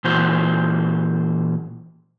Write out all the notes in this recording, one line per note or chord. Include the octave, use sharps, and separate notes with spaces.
A#2 E3 F#4 C5